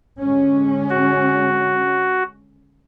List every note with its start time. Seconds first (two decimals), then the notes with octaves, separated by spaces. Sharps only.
0.21 D3 G#3 C#4
0.90 F#4